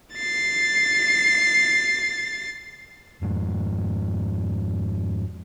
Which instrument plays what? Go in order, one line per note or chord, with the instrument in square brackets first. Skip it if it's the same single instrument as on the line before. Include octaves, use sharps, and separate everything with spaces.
[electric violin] A6 C7
[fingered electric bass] F2 G#2